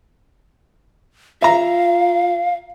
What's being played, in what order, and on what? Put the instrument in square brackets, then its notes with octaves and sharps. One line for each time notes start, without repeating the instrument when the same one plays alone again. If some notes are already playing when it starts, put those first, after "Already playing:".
[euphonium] F4 [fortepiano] E5 A#5 [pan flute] F5